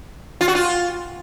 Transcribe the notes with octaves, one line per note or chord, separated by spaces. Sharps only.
F4
F#4
F4